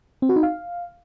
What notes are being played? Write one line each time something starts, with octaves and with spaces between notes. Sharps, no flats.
C4
F#4
D#4
F5